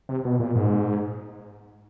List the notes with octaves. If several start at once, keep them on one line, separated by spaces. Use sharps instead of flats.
C3
B2
A#2
G#2